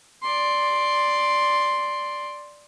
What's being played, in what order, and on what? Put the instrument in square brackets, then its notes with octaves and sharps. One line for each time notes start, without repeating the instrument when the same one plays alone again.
[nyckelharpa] D5 C6